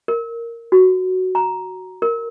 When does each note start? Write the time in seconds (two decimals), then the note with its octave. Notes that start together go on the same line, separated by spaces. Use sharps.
0.08 A#4
0.72 F#4
1.35 A#5
2.02 A#4